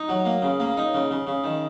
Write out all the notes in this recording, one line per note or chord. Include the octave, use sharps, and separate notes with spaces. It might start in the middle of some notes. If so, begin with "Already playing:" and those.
Already playing: D#4
F#3
A#3
C#3
A#3
D#4
C#3
C#3
C#3
D#3